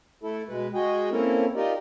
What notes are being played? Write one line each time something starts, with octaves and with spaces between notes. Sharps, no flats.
A3 E4 A4
B2 G#3 B4
G#3 F#4 G#4 D#5 G5
A#3 C4 C#4 E4 A4 A#4
D#4 F4 G4 A#4 D5 D#5